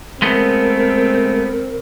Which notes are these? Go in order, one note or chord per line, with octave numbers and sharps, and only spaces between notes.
G#3 A3 B3 C4 A#4